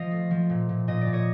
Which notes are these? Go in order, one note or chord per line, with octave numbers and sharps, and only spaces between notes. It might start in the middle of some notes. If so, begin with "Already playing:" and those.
Already playing: F3 D#5 F5
A3
F3
A#2
A#2
A#2 D#5
D5
A#2
C#5 D#5